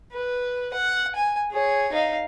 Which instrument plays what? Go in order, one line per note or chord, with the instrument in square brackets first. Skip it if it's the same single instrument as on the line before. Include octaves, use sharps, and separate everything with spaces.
[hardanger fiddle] B4
F#5
G#5
G#4 C#5
D#4 F5